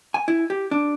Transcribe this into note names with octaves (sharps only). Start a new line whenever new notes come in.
G#5
E4
G4
D4